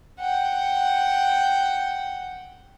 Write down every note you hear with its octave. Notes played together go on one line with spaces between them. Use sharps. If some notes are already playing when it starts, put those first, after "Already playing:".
F#5 G5